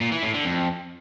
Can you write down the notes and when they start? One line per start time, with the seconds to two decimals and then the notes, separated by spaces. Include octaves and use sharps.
0.01 A#2
0.12 E3
0.23 A2
0.34 D3
0.45 F2